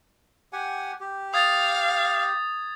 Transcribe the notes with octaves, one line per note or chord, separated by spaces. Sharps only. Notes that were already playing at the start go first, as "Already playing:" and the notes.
G4 F#5 G#5
G4
F5 D#6 G#6 A6